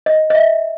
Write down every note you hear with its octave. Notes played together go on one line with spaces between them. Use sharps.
D#5
D#5
E5